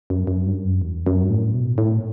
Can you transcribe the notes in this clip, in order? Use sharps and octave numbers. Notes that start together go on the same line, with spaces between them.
F#2
F#2
G2
F#2
E2
F#2
G2
A2
B2
A2